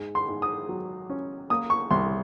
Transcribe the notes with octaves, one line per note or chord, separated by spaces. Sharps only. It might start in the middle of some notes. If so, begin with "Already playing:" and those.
Already playing: G#2
C6
G#2
D#6
F#3
C#4
A#3 D#6
C#6
C2 C6